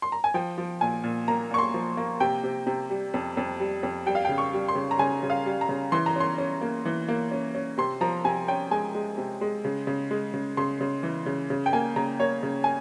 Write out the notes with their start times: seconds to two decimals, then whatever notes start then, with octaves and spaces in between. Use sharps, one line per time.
0.02 C6
0.12 A#5
0.24 G#5
0.34 F3 G5
0.58 F3
0.81 A#2 G#5
1.04 A#2
1.28 A#3 A#5
1.51 A#2 C#6
1.58 C6
1.74 F3
1.97 A#3
2.20 C3 G5
2.43 C3
2.67 C3
2.90 G3
3.14 F2
3.37 F2
3.60 G3
3.83 F2
4.06 G3 G5
4.15 F5
4.25 C#3 G5
4.38 C#6
4.53 G3
4.68 C6
4.75 C#3
4.91 A#5
4.99 C#3 G#5
5.23 C#3
5.30 F5
5.46 G3
5.61 A#5
5.69 C#3
5.92 E3 C6
6.06 A#5
6.16 C#4 C6
6.38 C#4
6.61 A#3
6.85 E3
7.08 A#3
7.31 C#4
7.55 C#4
7.78 C3 C6
8.01 F3 A#5
8.24 C3 G#5
8.48 C#4 G5
8.71 G#3 G#5
8.95 G#3
9.18 C3
9.41 G#3
9.65 C#3
9.87 C#3
10.11 G#3
10.34 C#3
10.57 C#3 C6
10.81 C#3
11.03 E3
11.26 C#3
11.50 C#3
11.66 G5
11.73 A#3 G#5
11.96 C#3 A#5
12.19 A#3 C#5
12.43 C#3
12.64 G#5